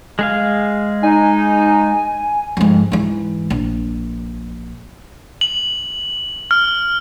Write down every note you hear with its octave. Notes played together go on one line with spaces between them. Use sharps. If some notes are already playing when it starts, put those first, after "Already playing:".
G#3 G#4 F5
D#4 G#5
F2 G#2
G#2 E3
A#1
F#7
F6